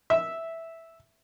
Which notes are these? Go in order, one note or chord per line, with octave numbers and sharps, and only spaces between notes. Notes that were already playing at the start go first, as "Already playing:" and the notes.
E5